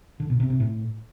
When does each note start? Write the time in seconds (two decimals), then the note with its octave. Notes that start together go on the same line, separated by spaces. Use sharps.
0.20 D3
0.30 B2
0.40 C3
0.50 C3
0.60 A2